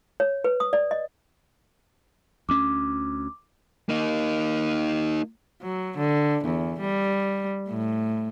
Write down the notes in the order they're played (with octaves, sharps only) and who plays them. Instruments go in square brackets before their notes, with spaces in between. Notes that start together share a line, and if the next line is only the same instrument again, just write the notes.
[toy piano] C#5
B4
D#6
D5
D#5
[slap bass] D2 C#4 [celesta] D6
[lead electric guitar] A#3 D#4
[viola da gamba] F#3
D3
E2
G3
A2